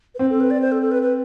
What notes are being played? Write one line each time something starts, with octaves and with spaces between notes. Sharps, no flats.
B4
C4 C5
A4
B4
D5
C5
A4
A4
B4
B4